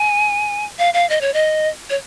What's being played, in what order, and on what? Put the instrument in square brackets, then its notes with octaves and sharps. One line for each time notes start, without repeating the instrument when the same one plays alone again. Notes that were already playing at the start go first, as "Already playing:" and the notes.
Already playing: [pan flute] G#5
F5
F5
D#5
C#5
D#5
C#5